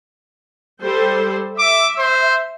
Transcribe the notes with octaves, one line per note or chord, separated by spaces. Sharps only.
G3 A4 C5
E5 D6
C5